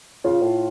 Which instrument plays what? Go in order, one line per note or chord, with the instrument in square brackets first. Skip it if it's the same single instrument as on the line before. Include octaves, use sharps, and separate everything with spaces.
[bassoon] C#3 [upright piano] F4
[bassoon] A2